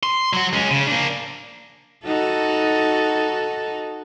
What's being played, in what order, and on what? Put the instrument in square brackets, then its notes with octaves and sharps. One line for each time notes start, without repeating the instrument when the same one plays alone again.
[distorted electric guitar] C6
F#3 F#4
G#3 C#4
C#3
A#3 D4
[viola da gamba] D#4 F#4 A4